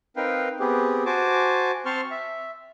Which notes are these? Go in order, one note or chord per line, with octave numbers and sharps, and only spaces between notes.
C4 D#4 A#4 B4 F5 G5
B3 C4 G4 G#4
F#4 C5 G#5 A5 D6
C4 C5 A5 C6 C#6 F6
E5